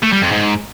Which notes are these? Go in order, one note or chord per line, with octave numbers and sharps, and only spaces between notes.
A3
G3
F2
G#2